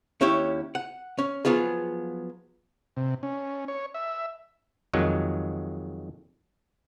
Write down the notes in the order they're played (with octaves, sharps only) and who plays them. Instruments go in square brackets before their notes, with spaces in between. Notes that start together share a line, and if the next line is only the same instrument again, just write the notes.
[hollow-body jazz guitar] D#2 C#4 E4 G4 C#5
F#5
C#4
F3 F#3 B3 F4 G#4
[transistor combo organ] C3
C#4
C#5
E5
[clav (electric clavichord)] F2 D#3 F#3 G#3